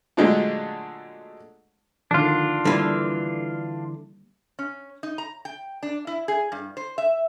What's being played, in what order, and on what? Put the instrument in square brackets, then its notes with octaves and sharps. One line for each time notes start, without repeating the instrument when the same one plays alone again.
[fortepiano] A#2 D3 F#3 G#3 A3 D4
[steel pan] D3 D#3 F3 [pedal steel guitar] D4 F4
[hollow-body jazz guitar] D3 E3 [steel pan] G3 A#3 B4
[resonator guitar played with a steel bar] C#4
D#4
A#5
G5
D4
E4
G#4
G2
C5
E5